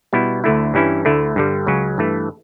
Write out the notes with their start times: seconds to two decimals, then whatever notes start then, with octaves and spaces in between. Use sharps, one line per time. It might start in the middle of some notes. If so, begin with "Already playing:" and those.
0.13 B2 G3 B3 E4
0.44 D2 D3 A3 E4
0.74 G2 E3 G3 C#4 E4
1.05 D2 D3 A3 E4
1.36 G2 D3 G3
1.66 C#2 C#3 F#3 C#4
1.98 G2 E3 A3